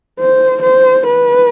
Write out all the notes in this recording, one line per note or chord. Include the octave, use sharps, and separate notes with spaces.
C5
C5
B4